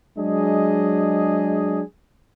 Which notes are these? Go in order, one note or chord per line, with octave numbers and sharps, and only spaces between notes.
F#3 G#3 D4 G#4 D#5